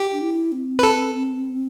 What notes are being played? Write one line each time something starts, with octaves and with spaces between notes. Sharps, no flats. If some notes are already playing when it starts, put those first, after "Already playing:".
Already playing: G4
D4
E4
C4
B4
A4